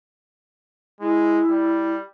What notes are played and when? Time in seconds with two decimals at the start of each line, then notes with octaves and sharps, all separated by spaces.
1.01 G#3 E4
1.49 G3